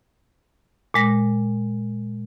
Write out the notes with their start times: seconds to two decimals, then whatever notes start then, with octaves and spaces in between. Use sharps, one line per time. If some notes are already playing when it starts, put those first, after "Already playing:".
0.94 A#2 G#3 A#6